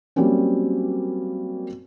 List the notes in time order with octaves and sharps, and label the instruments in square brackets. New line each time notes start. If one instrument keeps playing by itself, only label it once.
[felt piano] F#3 G3 A#3 C4 C#4